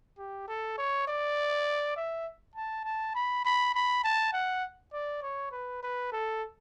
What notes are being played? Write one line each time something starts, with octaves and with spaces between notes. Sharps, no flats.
G4
A4
C#5
D5
E5
A5
A5
B5
B5
B5
A5
F#5
D5
C#5
B4
B4
A4